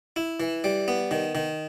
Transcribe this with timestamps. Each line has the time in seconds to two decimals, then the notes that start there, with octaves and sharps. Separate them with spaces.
0.16 E4
0.40 E3
0.64 G3
0.88 B3
1.11 D#3
1.35 D#3